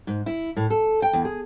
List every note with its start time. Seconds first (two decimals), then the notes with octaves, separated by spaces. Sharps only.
0.07 G#2
0.26 E4
0.56 A2
0.70 A4
1.02 G5
1.13 E2
1.25 G#4